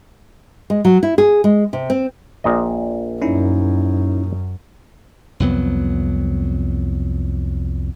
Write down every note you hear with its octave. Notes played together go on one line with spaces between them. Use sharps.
G#3
F#3
E4
G#4
G#3
C3
C4
A#1 A#2 D#5
F#2 C#4 D#4 E4
C2 F2 F#3 B3